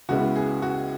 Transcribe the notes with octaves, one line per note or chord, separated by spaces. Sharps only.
C#2 C#3 G#3 B3 E4 F#4
G#4
F#4